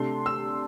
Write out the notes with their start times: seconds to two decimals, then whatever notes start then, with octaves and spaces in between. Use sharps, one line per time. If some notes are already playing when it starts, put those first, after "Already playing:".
Already playing: C3 A3 D4 C6
0.26 E6